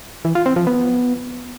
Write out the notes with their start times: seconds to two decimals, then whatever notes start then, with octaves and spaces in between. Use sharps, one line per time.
0.25 E3
0.35 F4
0.46 C4
0.56 F3
0.67 B3